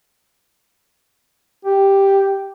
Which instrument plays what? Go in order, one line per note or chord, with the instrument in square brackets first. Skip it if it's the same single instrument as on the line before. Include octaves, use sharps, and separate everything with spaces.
[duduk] G4